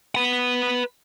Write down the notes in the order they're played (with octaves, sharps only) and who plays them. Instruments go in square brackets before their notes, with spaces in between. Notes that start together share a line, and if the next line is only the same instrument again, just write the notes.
[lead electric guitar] B4 F#5